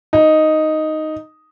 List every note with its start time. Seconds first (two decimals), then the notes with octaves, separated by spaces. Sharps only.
0.13 D#4